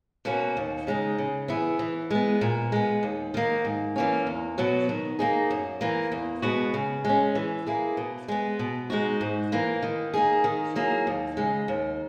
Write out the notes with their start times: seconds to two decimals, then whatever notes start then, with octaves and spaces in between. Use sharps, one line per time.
0.25 B2 A#3 C#4 F#4
0.57 D#2
0.87 C#3 G#3 D#4
1.18 C#3
1.48 E3 B3 E4 G#4
1.79 E3
2.10 G#3 B3
2.41 A#2
2.72 G#3 B3
3.03 D#2
3.34 D#3 A#3
3.65 G#2
3.96 E3 A#3 C#4
4.27 E2
4.58 B2 F#3 B3 F#4
4.89 D#3
5.19 A#3 D#4 G#4
5.51 F#2
5.81 E3 A#3
6.12 E2
6.42 B2 G#3 B3 F#4
6.74 C#3
7.05 G#3 C#4
7.35 E3
7.66 A#3 E4 G#4
7.97 B2
8.28 G#3 B3
8.59 B2
8.90 G#3 D#4 F#4
9.21 G#2
9.52 E3 A#3
9.83 D#3
10.14 A#3 D#4 G#4
10.44 D#3
10.75 F#3 A#3 E4 G#4
11.07 D#2
11.37 C#3 G#3
11.68 D#2